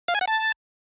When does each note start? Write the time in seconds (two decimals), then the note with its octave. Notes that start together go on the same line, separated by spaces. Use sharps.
0.08 F5
0.15 G#5
0.21 F#5
0.28 A5